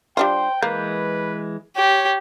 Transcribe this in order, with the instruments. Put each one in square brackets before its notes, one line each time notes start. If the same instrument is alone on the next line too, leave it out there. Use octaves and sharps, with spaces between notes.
[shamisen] G3 D4 F4 [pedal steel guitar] C5 C6 [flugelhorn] G5
[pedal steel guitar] E3 G#3 G6 [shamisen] A#3 [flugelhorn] B4
[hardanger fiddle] G4 [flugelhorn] C#5